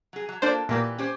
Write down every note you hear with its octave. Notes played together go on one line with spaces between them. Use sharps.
F#3 G#4
F#3
A#3 D4 F4 A4 C5
A#2 E3 A#3 G4 B4
C#4 G4 C5